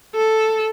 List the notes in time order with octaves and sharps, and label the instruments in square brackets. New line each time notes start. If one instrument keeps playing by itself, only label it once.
[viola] A4